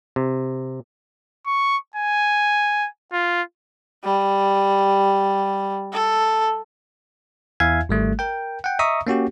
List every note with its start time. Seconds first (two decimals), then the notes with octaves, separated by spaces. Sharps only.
0.16 C3
1.47 C#6
1.96 G#5
3.13 F4
4.04 G3
5.93 A4
7.60 E2 E4 E5 F5 G#5 G#6
7.89 G#1 G3 A3
8.19 A#4 G5
8.64 F#5 G5
8.79 D#5 E5 A#5 C#6 D#6
9.07 A#3 C#4 F#4 G4